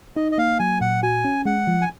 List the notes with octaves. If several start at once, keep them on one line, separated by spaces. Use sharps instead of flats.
D#4 D#5
D#5
A#3 F5
F#3 G#5
A#2 F#5
F#4 G#5
C#4
G#3 F#5
F3
G#5